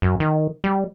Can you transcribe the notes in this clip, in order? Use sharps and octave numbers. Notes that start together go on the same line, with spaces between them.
F#2
D#3
G3